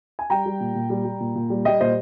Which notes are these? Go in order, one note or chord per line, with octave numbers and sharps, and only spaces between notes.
G#5
G3 G5 A#5
G3
A#2
A#2
G3
G3
A#2
A#2
G3
G3 D#5 G5
A#2 C5 D#5